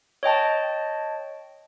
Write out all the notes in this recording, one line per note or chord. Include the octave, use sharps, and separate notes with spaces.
C#5 D#5 G5 A5